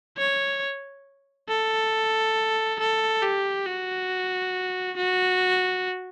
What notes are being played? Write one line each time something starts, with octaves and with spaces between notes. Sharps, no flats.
C#5
A4
A4
G4
F#4
F#4